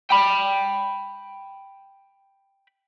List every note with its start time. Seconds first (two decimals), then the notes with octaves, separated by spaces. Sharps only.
0.10 G5 B5